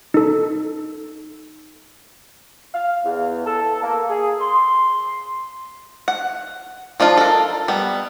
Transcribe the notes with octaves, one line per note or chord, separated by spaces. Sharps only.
D#4 A4
F5
E2
A4
A#3
G#4
C6
F#5
F3 D4 D#4 F4
A4 A#4
G3 B3